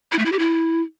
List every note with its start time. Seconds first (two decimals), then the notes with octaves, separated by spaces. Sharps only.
0.12 E4
0.19 A3
0.25 E4
0.32 G4
0.39 E4